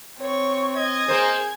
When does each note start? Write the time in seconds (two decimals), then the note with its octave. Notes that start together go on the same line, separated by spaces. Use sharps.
0.19 C4 C#5 C#6
0.77 D#5 G#6
1.08 A#3 G#4 A#4 C5